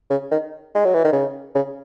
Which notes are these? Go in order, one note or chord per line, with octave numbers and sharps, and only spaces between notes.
C#3
D#3
G#3
F#3
E3
D#3
C#3
C#3